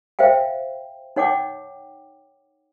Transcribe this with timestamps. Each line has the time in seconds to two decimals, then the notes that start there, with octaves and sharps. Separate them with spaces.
0.19 C5 E5 F5 G5
1.16 D#4 C#5 F#5 G5 D6